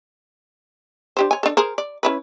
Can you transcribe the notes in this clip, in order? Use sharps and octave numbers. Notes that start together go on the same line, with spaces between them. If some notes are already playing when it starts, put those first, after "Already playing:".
D4 G4 C5
C#5 G#5
D4 A4
G#4 A#4 C5
D5
C#4 E4 B4